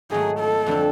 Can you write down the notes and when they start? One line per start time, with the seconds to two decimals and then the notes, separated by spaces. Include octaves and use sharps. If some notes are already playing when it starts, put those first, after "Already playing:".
0.11 G#2 D#3 F#3 A3 G#4
0.40 A4
0.66 F2 D3 G3 C4